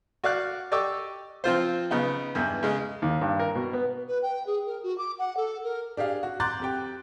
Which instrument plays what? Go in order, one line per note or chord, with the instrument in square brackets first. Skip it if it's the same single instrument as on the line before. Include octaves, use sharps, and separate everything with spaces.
[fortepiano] F#4 D5 F5 F#6
G4 D5 D#5 C#6 D6 E6
F3 C4 F4 C5
C#3 B3 D#4
E2 G2
C#3 G#3
D#2
G2
A#4
B2
B3
[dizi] B4
G5
G#4
A#4
F#4
D6
F#5
A4
A#4
[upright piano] D4 G4 G#4 F5
F#4
A#5 C6 D6 F#6 G6 A6
F2 G4 G5